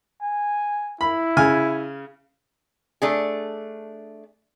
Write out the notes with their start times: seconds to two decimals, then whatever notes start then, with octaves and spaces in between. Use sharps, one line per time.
0.22 G#5
1.01 E4 B5
1.37 C#3 G#5 F6
3.02 A3 D4 G#4